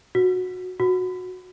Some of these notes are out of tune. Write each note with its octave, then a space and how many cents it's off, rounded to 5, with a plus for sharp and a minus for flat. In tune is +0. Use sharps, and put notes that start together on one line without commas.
F#4 -15
F#4 -15